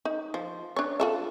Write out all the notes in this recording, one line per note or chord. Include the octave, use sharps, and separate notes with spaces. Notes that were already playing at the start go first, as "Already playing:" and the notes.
D#4
F3
D4 C#5
F4 A4 E5